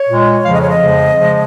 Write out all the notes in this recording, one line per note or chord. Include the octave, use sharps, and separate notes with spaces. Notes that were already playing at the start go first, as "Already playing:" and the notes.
Already playing: C#5
A#2 G#3
F2 C#3 F3 G#3 F5
D#5
C#5
D#5
F2 C#3 F3 G#3
C#3 F3 G#3